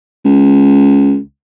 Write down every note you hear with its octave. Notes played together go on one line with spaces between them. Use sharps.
C#2